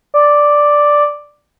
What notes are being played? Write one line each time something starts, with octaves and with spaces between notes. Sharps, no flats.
D5